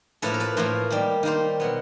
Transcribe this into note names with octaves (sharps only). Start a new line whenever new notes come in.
A2 F3 A#3 A4 B4
A#4
A4 B4
A2 F3 A#3 A#4 C5
D#3 G3 A#3
D#3 G3 A#3 A#4 C5
B2 F#3 B3